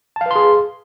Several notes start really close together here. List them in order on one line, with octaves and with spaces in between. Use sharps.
A5 F5 B4 C6 G#4